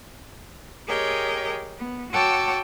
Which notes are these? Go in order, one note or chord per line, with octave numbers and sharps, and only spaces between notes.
G4 G#4 A#4 C#5 D#5 G5
B3
F#4 C#5 G5 A5 D6 E6